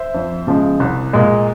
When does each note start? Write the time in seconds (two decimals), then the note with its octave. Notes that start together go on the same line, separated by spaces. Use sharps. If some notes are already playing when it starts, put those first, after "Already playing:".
Already playing: C5 E5
0.14 F2
0.47 C#3 F3 G#3
0.80 C2
1.13 A#2 G#3